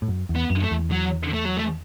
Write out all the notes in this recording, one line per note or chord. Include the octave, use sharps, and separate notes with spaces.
A2
F#2
E2
B3
F#2
A3
E2
F#3
A3
F#3
A3